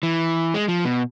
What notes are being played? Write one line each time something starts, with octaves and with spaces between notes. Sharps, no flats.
E3
G#3
F3
B2